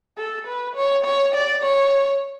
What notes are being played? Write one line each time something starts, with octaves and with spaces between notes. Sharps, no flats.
A4
B4
C#5
C#5
D5
C#5